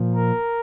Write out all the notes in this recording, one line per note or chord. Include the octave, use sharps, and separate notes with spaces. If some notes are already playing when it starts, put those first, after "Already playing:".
Already playing: A#2 F3
A#4